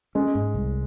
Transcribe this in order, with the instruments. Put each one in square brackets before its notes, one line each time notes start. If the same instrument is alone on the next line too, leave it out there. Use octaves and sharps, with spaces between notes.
[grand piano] G#3 [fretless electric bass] C#4
[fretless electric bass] G#2
C2